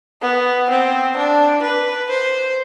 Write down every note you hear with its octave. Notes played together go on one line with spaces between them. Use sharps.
B3
C4
D4
B4
C5